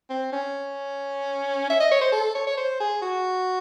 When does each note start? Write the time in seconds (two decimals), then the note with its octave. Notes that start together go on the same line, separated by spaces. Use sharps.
0.10 C4
0.33 C#4
1.70 E5
1.80 D#5
1.92 C#5
2.01 C5
2.12 A4
2.35 C#5
2.47 C#5
2.57 C5
2.80 G#4
3.02 F#4